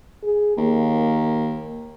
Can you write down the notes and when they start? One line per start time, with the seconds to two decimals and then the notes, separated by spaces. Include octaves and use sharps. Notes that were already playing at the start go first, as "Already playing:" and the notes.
0.23 G#4
0.58 D#2 A#3